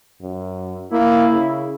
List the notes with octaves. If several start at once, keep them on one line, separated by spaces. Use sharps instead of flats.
F#2
A#3 E4
C#3